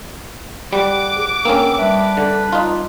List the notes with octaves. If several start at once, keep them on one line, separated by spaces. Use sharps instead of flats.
G3 F#5 D6
G#4
A#3 B3 C#4 D4 F5 G5 E6
G3 D4 B4 E5 B5
D3
D#4 F4